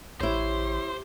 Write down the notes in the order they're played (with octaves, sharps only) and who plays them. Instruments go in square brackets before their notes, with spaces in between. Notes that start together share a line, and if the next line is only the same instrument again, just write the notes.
[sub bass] A1 [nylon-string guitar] E4 C#5 [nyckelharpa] G4 [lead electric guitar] C5